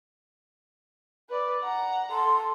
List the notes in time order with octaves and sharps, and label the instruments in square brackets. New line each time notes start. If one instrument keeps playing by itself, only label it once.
[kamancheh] B4 D5
F#5 A#5
[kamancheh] A4 [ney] C6